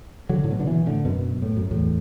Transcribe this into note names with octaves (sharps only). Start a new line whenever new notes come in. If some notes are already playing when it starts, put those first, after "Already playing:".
D3 F#3
A2
B2
D3
B2 E3
A2 D3
F#2 B2
A2
F#2
E2 A2